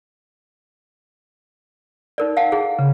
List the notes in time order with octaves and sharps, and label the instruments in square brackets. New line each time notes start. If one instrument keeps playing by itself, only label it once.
[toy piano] D#4 A#4 D5
F5 F#5 A5
E4 G#4 F#5
[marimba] C#3